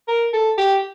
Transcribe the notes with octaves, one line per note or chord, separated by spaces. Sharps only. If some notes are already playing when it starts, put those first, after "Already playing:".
A#4
A4
G4